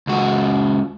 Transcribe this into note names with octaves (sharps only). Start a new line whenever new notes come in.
C#2 F#4